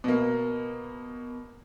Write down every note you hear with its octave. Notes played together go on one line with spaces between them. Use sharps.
B2 A#3